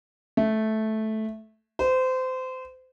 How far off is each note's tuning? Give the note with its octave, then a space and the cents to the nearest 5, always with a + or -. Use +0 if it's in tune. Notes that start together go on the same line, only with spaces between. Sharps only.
A3 -10
C5 -25